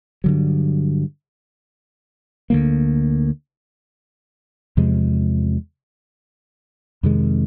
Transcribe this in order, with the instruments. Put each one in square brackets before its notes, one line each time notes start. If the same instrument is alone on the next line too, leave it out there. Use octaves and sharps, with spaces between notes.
[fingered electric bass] G2 D3 F#3
D2 D3 F3 A#3
E2 C3 F3 G#3
F2 C3 D#3 G#3